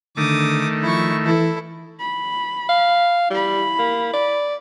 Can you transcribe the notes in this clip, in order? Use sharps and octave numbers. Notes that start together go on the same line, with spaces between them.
D3 D#3 A3 D6 D#6
F3 E4 C#6
E3 E4 A4
B5
F5
G3 E4 B5
A#3
D5